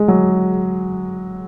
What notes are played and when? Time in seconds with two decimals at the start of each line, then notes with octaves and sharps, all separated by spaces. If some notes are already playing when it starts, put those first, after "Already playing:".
Already playing: G#3
0.08 F#3